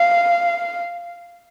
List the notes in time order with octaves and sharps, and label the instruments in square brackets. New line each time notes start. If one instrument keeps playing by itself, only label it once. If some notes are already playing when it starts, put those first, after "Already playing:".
Already playing: [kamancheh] F5